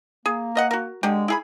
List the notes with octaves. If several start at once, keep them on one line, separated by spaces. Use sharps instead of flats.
A#3 G#4
A#4 D#5 F#5
F#4 A#4
D3 G#3 G4
E4 G#4 B5